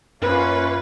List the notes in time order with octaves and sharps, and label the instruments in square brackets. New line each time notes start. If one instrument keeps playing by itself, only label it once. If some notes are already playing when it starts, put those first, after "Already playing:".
[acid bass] F#2 [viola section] A#3 C#4 F4 [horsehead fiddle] B4